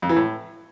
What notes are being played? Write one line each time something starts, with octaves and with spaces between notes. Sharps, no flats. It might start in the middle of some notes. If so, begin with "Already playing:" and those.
F2
E3
A2